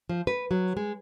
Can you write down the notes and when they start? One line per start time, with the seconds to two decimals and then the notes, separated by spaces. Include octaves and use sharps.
0.09 F3
0.27 B4
0.51 F#3
0.77 G#3